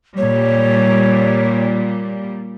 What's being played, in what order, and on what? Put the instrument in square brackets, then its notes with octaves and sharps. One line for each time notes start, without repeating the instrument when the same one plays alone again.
[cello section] A#2 G3 [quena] C#5